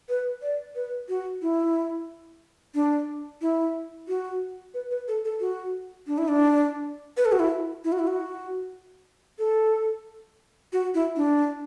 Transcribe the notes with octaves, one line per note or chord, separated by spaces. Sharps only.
B4
D5
B4
F#4
E4
D4
E4
F#4
B4
B4
A4
A4
F#4
D4
E4
D4
B4
A4
F#4
E4
E4
F#4
E4
F#4
A4
F#4
E4
D4